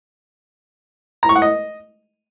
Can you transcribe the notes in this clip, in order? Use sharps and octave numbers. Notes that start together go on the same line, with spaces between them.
A#5
C#6
F#5
D#5